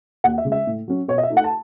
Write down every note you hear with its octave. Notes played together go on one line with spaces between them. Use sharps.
D#2 F#5
E5
C#3 G#3
E5
A2
F#3 C#4
B2 C#5
D#5
E5
A3 D#4
F#5
A5